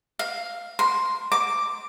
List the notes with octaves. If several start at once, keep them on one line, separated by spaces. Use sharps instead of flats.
F5
C6
D6